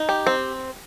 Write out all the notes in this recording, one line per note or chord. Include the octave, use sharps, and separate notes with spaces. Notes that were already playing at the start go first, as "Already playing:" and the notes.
Already playing: D#4
G4
C4